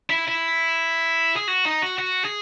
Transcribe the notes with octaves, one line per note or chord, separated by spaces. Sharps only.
E4
E4
G#4
F#4
D#4
F#4
F#4
G#4